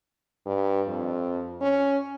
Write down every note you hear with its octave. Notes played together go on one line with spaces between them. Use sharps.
G2
F2
C#4